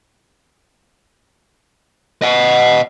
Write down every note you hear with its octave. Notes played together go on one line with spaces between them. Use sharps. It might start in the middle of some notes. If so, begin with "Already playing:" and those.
D#5 F#5